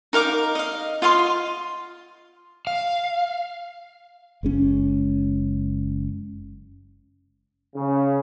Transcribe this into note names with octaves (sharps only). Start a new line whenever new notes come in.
D#4 A#4 F5 D6
D#5 F5
F4 D#5 F5 C6
F5
F#1 G#3 C#4
C#3